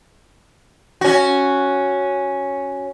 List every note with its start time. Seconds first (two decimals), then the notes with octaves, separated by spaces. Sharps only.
1.01 C#4 F#4